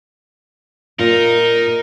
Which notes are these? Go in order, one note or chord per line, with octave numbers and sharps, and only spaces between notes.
A#2 D#4 F4 A#4